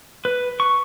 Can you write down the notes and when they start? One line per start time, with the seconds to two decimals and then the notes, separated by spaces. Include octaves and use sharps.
0.25 B4
0.60 C#6